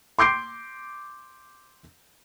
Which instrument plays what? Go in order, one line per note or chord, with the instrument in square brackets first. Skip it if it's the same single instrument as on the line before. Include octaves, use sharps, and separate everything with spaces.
[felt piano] C6 D6 G6 C7 D7